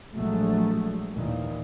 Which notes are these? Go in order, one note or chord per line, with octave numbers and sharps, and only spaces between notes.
A#1 F#3 G#3 A3
D#2 A#2 D#3 E3